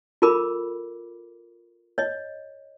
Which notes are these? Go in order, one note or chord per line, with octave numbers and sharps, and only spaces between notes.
F4 A4 A#4 B5 D6
C#5 D#5